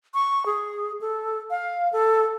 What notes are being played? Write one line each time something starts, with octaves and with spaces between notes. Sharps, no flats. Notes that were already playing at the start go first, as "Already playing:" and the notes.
C#6
G#4
A4
F5
A4